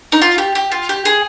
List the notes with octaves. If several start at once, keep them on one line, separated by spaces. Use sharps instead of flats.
D#4
F4
G4
G4
F4
G4
G#4